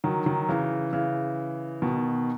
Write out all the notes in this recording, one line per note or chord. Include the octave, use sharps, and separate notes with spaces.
D#3 F#3
D#3 F#3
C#3 E3
C#3 E3
B2 D#3